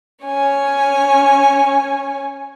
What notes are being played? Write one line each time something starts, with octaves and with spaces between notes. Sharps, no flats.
C#4 C#5 G#5